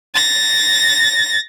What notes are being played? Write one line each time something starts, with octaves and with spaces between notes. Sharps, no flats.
A6 A#6